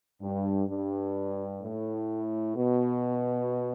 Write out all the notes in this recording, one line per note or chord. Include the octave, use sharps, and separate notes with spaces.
G2
G2
A2
B2